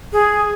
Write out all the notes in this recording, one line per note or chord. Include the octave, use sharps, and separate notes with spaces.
G#4